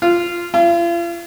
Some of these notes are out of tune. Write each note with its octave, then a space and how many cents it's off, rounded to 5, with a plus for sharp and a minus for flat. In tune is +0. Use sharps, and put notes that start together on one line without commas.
F4 -10
F4 -40